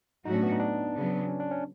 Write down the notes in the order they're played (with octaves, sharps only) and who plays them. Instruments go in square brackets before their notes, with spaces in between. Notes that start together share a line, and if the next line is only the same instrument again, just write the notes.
[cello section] A2 F#3 A3 C#4 F#4 [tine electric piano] D#4
[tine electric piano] D4
B3
D#4
D4
[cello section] C#3 F#3 B3
[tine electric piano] C#4
D4
C#4